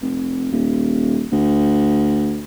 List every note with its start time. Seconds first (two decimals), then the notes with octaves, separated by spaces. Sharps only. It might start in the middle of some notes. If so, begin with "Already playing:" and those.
0.02 F1
0.52 D#1
1.32 D2